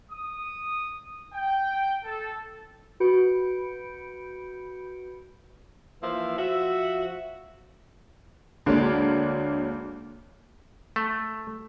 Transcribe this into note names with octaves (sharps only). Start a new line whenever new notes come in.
D#6
G5
A4
F#4 B4 B5 G6 C#7 D7
E3 F3 A#3 E5
F3 F#4 E5
D2 G#3 A#3 D4 C#5 D5
A3